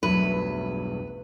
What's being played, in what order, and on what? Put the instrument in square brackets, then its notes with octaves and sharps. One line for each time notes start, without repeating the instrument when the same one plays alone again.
[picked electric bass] B1 G2 [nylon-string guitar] E2 F#3 A3 [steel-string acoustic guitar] B4